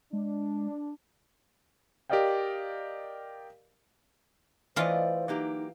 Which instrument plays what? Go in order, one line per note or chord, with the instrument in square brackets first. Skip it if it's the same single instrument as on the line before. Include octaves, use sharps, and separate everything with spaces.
[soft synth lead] G#3 [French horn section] D4
[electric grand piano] G4 A#4 D5 D#5 F5 G5
[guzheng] E3 F4 [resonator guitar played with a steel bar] A3 D5 D#5 [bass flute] C5
[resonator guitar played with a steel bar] F#3 A#3 G4 [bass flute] D#4